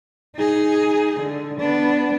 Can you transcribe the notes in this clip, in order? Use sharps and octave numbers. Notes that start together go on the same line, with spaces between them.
D#4 G#4
D3
B3 D4